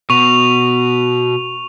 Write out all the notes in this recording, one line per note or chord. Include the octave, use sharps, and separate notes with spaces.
B2 C#6 F7